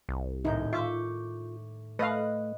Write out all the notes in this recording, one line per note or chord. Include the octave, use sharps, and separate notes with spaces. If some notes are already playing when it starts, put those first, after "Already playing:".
C2
D#1 A2 D#4 G6
F4 E5 C#6 D6 G6
A3 B4 D#5 F5 F#6 D#7